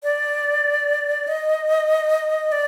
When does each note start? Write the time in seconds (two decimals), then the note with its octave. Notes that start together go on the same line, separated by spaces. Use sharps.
0.03 D5
1.27 D#5
2.52 D5